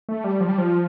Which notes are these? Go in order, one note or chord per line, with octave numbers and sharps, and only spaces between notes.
A3
G3
F3
G3
F3